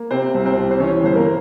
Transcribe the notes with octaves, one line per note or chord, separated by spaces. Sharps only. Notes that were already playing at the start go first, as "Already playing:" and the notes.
Already playing: A#3
C3 C4 C5
C2
C4 C5
C2
C5
E3 C#4 C#5
G1 C5
A#3 A#4